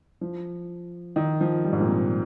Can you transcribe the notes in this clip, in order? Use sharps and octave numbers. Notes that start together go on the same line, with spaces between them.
F3
D#3
F3
G3
G#2
A#2
C3